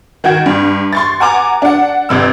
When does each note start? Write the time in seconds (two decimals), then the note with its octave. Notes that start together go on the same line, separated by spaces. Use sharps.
0.24 D#3 F#4 G5 G#6
0.46 G2
0.93 C6 C#6 A6
1.20 F#5 G#5 A#5 D6
1.62 D4 F#5
2.09 G1 C3 E6